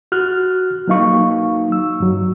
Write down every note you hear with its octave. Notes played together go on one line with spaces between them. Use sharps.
F#4 F6 F#6
F#3 A#3 D#4 F5 C#6
E6
G2 F#3